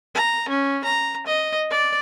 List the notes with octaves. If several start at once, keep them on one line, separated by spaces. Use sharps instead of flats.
A#5
C#4
A#5
D#5
D5